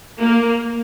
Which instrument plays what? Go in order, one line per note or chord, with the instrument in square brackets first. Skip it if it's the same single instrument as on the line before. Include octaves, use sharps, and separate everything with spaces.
[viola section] A#3